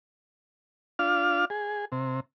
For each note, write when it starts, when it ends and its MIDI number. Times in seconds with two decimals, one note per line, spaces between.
0.99 1.45 62
0.99 1.45 65
0.99 1.45 77
0.99 1.45 89
1.50 1.85 68
1.92 2.20 48